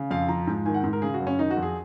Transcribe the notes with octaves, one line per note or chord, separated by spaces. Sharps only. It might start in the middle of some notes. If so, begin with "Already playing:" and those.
Already playing: C#3
F2 F5
F3 A#5
G#2
D#3 G#5
F#5
G#2
A#4
C#3 G#4
F#4
F#2
C#4
D#3 D#4
F#4
F2
G#4